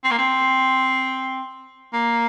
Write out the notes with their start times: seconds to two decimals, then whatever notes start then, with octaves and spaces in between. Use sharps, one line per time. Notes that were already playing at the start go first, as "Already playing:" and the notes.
0.04 C4
0.11 A#3
0.18 C4
1.93 A#3